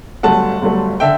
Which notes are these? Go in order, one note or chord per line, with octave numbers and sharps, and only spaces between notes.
G1 G2 F#3 A3 F#5 A5
G1 G2 F#3 A3
D3 E5 G5